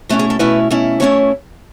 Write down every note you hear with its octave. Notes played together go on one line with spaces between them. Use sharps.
B2 A3 C#4 E4 F#4
G#4
A4
B2 A3 C#4 E4 B4
B2 A3 C#4 E4
B2 A3 C#4 E4 C#5